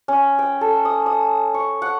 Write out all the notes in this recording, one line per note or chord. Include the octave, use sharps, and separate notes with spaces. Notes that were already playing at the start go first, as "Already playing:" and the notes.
C#4
G5
A4
D#6
D#6
C#6
F#5